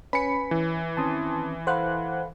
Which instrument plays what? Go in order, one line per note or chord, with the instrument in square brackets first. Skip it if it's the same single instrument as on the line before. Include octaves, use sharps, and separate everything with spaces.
[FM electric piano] C#4 [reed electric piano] B4 G#5 [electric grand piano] B5 C#7
[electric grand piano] E3
[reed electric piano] D#3 C4 C#4 [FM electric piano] A5 C6 D#6
[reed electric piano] A4 F5 B5 [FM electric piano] C5 F#5 F#6